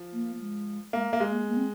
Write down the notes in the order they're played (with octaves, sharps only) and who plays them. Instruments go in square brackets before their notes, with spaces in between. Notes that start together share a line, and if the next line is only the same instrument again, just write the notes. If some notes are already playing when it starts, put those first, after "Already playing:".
Already playing: [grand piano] F3
[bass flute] A#3
G#3
[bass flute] G#3 [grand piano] A#3
[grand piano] A#3
G#3
[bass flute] A#3
A#3
C4